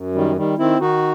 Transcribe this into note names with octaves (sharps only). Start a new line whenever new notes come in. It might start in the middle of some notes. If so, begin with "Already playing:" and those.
Already playing: F#2
D#3 G3
D#3 G3
D#3 C4 E4
D#3 D#4 F#4